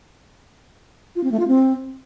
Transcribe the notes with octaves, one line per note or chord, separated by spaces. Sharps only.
F4
C4
A3
F4
C4